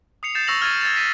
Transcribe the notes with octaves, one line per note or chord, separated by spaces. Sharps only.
D#6 C7 C#7 F7
G6 A6 C7 E7
C#6 E6 A#6 F7 F#7
F6 G#6 A6 D#7
G#6 A6 F7
A6 B6 D#7